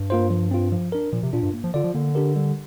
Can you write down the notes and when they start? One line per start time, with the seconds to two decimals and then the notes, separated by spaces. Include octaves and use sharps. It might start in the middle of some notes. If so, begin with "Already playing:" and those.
Already playing: G2
0.10 A#3 F4 C5
0.30 F3
0.51 C4 F4
0.72 F3
0.92 D4 A#4
1.12 A#2 F3
1.23 C3
1.33 A#2 D4 F4
1.43 G2
1.53 A#3
1.64 F3
1.74 D3 F4 D5
1.84 F3
1.94 D3 A#3
2.15 D4 G4 A#4
2.36 G3